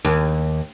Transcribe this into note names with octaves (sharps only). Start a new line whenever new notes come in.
D#2